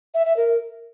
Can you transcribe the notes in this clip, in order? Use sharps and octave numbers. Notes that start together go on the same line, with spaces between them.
E5
E5
A#4